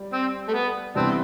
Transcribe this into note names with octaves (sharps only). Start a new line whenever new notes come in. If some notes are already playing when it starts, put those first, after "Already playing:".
Already playing: G3 G4 D5
C4
A3
B3
C3 E3 G3 B3 C4 D4